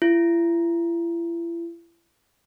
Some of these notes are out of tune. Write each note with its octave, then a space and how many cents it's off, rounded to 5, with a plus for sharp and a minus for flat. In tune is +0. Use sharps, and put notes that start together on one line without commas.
E4 +40